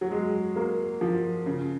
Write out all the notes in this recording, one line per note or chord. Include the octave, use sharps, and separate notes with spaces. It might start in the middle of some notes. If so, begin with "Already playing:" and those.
F#3
G#3
A#3
F3
C#3